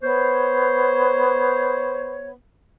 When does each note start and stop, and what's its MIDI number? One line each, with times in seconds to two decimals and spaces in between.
0.02 2.34 59
0.02 2.31 72
0.02 2.31 73